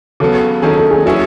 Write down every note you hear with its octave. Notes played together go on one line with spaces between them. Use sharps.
C#3 F#3 B3 A4
D#3 F#3 C#4 G#4 A4
A4
G#4
F#3 C#4 E4 F#4 G#4